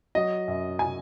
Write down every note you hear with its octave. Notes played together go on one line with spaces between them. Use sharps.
F#3 D#5
F#2
F#3 G#5